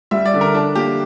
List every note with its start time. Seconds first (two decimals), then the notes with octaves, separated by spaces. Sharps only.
0.11 G3 E5
0.25 D5
0.34 D3
0.41 A#4
0.55 D4
0.75 A#3 G4